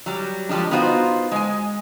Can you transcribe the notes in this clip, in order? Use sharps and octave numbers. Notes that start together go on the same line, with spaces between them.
F#3 G3
F3 G3 G#3 D4
B3 D#4 F4 F#4 C5
G#3 G#5